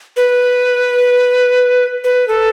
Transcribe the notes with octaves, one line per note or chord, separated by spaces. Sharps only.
B4
B4
A4